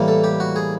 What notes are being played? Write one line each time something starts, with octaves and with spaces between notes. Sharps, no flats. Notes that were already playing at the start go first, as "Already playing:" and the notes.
Already playing: A2 E3 G3 A#3
A4
G4
F#4
G#4